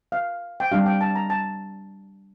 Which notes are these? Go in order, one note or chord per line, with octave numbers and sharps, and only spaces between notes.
F5
G5
G3 D4 G4 F5
G5
A5
A#5
A5